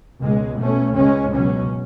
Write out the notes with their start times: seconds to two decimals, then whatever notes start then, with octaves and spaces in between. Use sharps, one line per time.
0.20 C#2 B2 G#3
0.59 B2 A3 C#4
0.95 C#2 C#3 G#3 C#4
1.32 C#2 B2 F#3 C#4